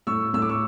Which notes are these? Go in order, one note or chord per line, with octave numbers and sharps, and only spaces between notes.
A2 C#6 E6
A2 E6
D6
C#6 E6